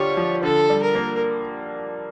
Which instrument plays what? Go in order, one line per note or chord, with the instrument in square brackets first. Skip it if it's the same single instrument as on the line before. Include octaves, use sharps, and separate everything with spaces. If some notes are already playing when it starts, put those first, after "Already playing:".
Already playing: [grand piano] D3 G3 F4 G4 [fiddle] C#5
[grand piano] F3
[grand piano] D3 [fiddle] A4
[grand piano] G3
[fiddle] A#4
[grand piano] A#3